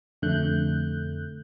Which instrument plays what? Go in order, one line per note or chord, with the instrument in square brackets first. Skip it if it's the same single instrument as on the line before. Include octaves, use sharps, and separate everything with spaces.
[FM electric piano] F2 B2 D3 A3 F#6 G6